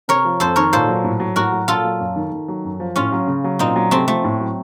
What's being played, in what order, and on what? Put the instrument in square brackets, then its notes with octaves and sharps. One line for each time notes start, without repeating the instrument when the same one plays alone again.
[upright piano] C3 [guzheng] A#4 C#5
[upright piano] F3
[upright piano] F2 [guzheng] A4 C5
[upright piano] D#3 [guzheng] A#4 C#5
[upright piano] A#2 [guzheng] A4 C5
[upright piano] F#3
A2
F#3
[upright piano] A2 [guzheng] F#4 A#4
[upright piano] F#3
[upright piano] A#2 [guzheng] F4 A4
[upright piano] F#3
F#2
D#3
D#3
F#3
F#2
F3
[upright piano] A2 [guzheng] C#4 F4
[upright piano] F#3
C#3
F#3
[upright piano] A#2 [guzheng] C4 D#4
[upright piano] F#3
[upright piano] C3 [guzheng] A3 C4
[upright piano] F3 [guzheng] A3
[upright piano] A2
F#3